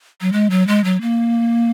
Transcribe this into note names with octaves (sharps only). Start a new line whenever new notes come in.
F#3
G#3
F#3
G#3
F#3
A#3